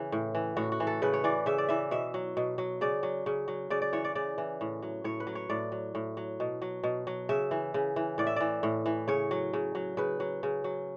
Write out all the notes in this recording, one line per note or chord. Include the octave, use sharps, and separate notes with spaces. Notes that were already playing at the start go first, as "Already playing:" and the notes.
Already playing: C#3 E3
A2
E3
A2 F#4
F#4
E3
A4
C#3 B4
C#5
E3 D5
C#3 E5
D5
E3 E5
B2 E5
F#3
B2
F#3
C#3 D5
F#3
C#3
F#3
C#3 D5
D5
E3 C#5
D5
C#3 D5
E3
A2
F#3
A2 C#5
B4
F#3
C#5
A2 D5
F#3
A2
F#3
B2
F#3
B2
F#3
C#3 E5
E3
C#3
E3
A2 D5
E5
E3 D5
A2
E3
C#3 C#5
F#3
C#3
F#3
C#3 B4
F#3
C#3
F#3